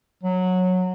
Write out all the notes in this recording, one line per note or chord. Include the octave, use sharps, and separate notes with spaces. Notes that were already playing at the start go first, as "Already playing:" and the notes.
F#3